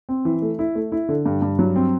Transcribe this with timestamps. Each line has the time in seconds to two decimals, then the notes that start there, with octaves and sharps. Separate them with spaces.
0.09 C4
0.25 E3
0.42 A3
0.59 E4
0.75 A3
0.92 E4
1.09 D3
1.26 G2
1.42 G2
1.59 F#3
1.76 C4